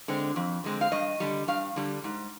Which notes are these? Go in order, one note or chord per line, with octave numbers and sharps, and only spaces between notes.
D3 G#3 C4
F2
D3 G#3 C4
F5
G2 D#5
D3 G3
G2 F5
D3 G3
G#2